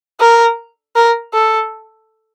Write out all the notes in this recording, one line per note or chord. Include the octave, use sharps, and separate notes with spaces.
A#4
A#4
A4